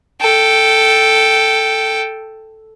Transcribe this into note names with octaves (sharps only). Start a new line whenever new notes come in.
A4 G5